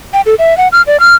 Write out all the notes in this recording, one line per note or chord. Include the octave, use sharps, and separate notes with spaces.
G5
A4
E5
F#5
F6
D5
F6